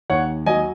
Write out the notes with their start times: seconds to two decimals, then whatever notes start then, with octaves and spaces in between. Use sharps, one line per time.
0.10 D#2 C#5 F#5
0.46 F#3 D#5 G#5